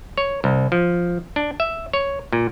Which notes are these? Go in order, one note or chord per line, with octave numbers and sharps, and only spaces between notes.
C#5
C2
F3
D4
E5
C#5
A#2